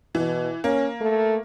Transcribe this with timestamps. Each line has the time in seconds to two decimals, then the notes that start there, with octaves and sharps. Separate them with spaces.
0.15 B2 E3
0.64 A#3 C#4
1.01 A3